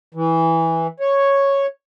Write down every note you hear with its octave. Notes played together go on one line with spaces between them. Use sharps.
E3
C#5